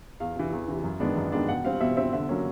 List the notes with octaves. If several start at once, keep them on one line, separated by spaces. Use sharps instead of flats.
E2 F5
C3 E3
E2
C3 E3
F#2
D#3 G#3 B3 D4
F#2
D#3 G#3 B3 D4
B2 F#5
G3 C4 F5
B2 E5
G3 C4 E5
D3 E5
F#3 A#3 C#4